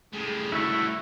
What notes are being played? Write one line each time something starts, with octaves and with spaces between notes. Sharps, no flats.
A2 G3 G#4
E4 F#4 E5 A5 C#6